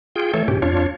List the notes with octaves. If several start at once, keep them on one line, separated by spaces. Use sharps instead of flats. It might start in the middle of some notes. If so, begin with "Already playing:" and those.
F4 G#4 G5
E3 A3 A4 C#5
G#2 B2 C#4 G4
F2 D4 F4 C#5